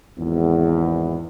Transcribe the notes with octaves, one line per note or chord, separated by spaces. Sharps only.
G#1 E2